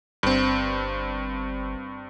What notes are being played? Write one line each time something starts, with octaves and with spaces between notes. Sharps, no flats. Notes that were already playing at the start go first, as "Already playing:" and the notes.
G1 G2 C4